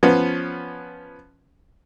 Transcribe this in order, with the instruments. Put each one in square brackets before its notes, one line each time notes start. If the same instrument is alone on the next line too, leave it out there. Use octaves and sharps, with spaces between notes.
[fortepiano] F3 B3 C#4